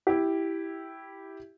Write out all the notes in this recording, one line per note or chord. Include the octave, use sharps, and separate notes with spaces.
E4 G4